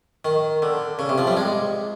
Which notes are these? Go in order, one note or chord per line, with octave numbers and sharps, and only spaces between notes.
D#3
D3
C#3
C3
F3
G3
G#3